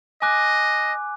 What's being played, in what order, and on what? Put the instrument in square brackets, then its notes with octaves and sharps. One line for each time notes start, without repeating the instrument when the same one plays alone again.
[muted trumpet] D#5 [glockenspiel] G#5 D6 F#6